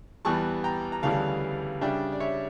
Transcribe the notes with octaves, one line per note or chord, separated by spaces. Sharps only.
E2 E3 G3 A5 C#6
G5 A#5
A#5
D2 C#3 E3 G3 F5 A5
C#3 G3 D4 E5 G5
D5
C#5 E5